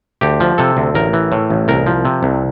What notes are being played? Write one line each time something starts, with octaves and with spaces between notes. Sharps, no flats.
D2 G4
F3
C3 A4
D2
A1 A#4
E3
A2
A1
C2 A#4
F3
C3
C2